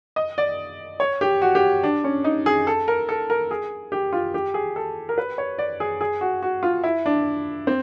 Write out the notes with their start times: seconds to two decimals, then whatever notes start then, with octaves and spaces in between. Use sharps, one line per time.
0.16 D#5
0.38 D5
1.00 C#5
1.21 G4
1.42 F#4
1.55 G4
1.83 D4
2.04 C#4
2.24 D#4
2.46 G#4
2.67 A4
2.88 A#4
3.09 A4
3.30 A#4
3.51 G#4
3.92 G4
4.13 F4
4.34 G4
4.54 G#4
4.76 A4
5.09 A#4
5.18 B4
5.38 C#5
5.58 D5
5.80 G#4
6.01 G#4
6.21 F#4
6.42 F#4
6.63 F4
6.84 E4
7.06 D4
7.67 C4